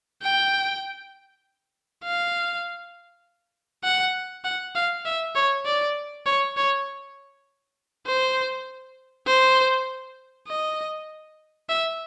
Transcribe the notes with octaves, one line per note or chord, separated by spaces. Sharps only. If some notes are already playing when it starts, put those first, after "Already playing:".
G5
F5
F#5
F#5
F5
E5
C#5
D5
C#5
C#5
C5
C5
D#5
E5